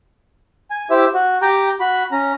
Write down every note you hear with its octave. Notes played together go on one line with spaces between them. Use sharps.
G#5
E4 G4 C5 E5
F#4
G4 G5 A#5
F#4 B5
C#4 A#5